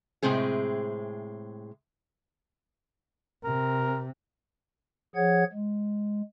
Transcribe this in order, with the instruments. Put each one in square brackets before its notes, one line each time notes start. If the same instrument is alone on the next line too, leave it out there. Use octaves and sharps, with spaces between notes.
[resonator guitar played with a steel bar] A2 C3 G#3 C4 G#4
[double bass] C3 [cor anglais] A#4
[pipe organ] F3 G#4 C#5 F#5 G#6
G#3